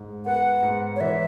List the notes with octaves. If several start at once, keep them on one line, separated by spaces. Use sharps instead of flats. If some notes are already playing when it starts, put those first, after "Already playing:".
Already playing: G#2
B3 F#5
G#2
C#5
E3 E5